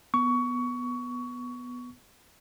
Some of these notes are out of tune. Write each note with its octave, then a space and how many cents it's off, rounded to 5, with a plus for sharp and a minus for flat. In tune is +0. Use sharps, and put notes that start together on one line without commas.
B3 +0 C#6 +20